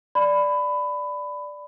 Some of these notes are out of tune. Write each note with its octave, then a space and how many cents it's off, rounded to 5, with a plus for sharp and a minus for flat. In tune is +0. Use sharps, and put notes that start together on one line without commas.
D5 -5 B5 +20